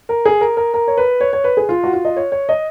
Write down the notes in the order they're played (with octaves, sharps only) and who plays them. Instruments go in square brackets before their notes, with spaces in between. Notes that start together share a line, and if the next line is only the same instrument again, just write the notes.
[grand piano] A#4
G#4
A#4
A#4
A#4
C#5
B4
C#5
C#5
B4
G#4
F4
F#4
F4
D#5
C#5
C#5
D#5